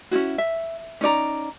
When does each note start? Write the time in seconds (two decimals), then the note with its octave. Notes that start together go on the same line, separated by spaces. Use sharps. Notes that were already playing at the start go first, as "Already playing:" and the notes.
0.11 C#4 D#4 E4 F#4
0.38 E5
1.01 C#4 D#4 D5 A#5